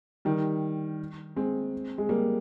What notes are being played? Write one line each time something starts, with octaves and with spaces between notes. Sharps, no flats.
D#3 G3
G#3 C4
G#3
G3 A#3